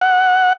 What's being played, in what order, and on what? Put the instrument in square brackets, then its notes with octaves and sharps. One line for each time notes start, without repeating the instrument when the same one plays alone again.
[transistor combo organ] F#5